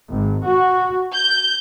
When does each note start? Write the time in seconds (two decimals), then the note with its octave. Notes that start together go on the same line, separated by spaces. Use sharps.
0.11 G#1
0.46 F#4
1.14 G6